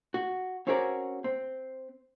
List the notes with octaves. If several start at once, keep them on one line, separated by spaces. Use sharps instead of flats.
F#4
C4 C#4 F#4 G#4 A#4 D5
C4